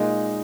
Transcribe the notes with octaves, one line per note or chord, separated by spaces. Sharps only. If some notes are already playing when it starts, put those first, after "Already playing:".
Already playing: A#2 G#3 D#4